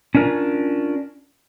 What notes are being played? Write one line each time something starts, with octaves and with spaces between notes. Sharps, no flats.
C#4 D4 F4 A#4